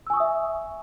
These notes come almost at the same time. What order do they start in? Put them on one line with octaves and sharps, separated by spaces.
E6 G#5 C#6 D#6 E5